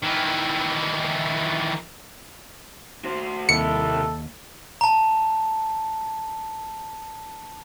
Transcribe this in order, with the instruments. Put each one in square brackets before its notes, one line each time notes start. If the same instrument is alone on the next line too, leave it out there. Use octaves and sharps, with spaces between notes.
[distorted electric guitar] D#3 E3
[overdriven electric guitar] F#4 C5
[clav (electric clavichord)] D#2 [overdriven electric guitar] C3 E4 [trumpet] A4 [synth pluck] C#7
[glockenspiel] A5 A#5